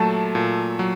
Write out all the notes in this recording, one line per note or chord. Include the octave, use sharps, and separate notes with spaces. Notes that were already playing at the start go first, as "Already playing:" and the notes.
Already playing: A#2 F#3 A3 A5
A#2
F#3